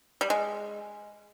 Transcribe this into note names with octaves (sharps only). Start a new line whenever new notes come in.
G3
G#3